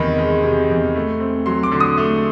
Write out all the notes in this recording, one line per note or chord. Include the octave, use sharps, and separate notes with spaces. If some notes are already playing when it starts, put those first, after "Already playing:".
Already playing: E2 C3 D#3 B5
G#3
C3
E2
A3
C4
F#3 C6
D6
D3
D#6
A3